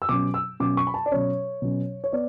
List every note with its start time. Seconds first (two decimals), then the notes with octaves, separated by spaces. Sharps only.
0.02 E6
0.09 B2 F#3 C#4 D6
0.34 E6
0.60 B2 F#3 C#4 D6
0.77 C#6
0.87 B5
0.94 A5
1.06 D5
1.11 B2 F#3 C#4 C#5
1.62 B2 F#3 C#4
2.04 C#5
2.13 B3 D5